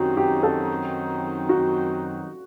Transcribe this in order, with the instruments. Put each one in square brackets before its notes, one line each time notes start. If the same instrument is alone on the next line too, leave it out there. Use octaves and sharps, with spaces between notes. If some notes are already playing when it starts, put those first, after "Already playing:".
Already playing: [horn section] F#2 D#3 F#3 C4 D#4 [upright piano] F#4 G4
[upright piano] G4
A4
F#4